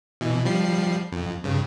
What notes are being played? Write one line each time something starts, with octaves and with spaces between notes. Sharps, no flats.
B2 E3
F3 G3 C7
F2
G2 C#3